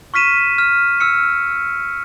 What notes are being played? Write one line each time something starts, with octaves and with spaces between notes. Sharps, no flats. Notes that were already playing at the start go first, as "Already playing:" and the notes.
C#6 F6 B6 D#7 E7
F6
E6 F6 C#7